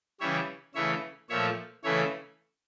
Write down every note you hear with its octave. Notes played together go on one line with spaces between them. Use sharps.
C#3 E3 G3 C#5 E5
C#3 E3 A3 C#5 E5
A#2 F3 A3 C#5 E5
C#3 E3 A3 C#5 E5